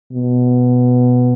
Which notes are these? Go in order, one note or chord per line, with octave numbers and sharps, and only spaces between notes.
B2